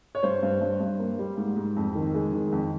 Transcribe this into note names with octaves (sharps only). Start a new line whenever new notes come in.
C#5
G2 C5
G2
G2
G2
A#3
G3
G#2
G#2
F2
D#3
G#3
D#3
F2